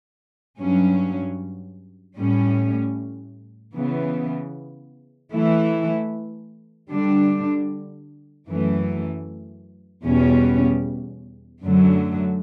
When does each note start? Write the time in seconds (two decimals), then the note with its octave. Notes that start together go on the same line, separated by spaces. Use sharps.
0.59 G2 F#3 C#4
2.17 A2 G3 C#4
3.75 C#3 E3 B3
5.32 E3 A3 E4
6.90 D3 G3 D4
8.47 F#2 E3 A3
10.05 E2 B2 G3 C#4
11.63 F#2 D3 F#3 A3